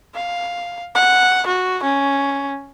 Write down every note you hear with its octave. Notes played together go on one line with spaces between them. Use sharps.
F5
F#5
F#4
C#4